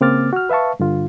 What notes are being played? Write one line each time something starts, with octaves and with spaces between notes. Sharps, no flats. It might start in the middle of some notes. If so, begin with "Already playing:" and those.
C#3 A#3 C4 D6 F6 A6
F#4 F6
B4 E5 F5 A5 C#6
G2 D3 F4